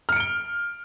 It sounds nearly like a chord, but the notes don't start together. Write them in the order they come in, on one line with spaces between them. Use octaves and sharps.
F6 C#7 D7 G7